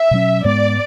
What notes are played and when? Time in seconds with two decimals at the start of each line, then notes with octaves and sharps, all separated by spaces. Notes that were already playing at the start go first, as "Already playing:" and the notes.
Already playing: E5
0.11 B2 F#3 C#4
0.45 G#2 G#3 B3 D5